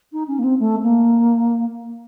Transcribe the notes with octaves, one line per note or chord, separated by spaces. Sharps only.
D#4
C#4
A#3
C4
A3
A#3